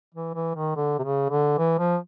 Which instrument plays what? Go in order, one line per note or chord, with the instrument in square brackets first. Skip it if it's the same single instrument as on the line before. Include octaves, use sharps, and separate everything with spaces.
[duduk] E3
E3
D#3
D3
C3
C#3
D3
E3
F3